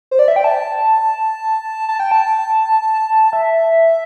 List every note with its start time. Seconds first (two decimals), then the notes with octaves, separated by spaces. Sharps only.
0.11 C5
0.19 D5
0.28 E5
0.36 G5
0.44 A5
1.89 A5
2.00 G5
2.11 A5
3.33 E5